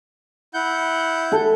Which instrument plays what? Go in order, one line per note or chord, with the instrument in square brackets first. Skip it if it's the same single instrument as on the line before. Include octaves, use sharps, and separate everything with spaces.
[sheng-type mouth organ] E4 F#5 G6
[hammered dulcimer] A4